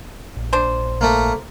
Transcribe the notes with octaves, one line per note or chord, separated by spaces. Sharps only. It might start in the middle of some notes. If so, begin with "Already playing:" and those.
A#1
D4 C5
A3 A#3